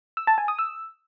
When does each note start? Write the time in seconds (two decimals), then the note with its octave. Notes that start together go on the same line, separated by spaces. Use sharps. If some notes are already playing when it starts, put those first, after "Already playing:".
0.17 E6
0.27 A5
0.38 G#5
0.48 D#6
0.59 E6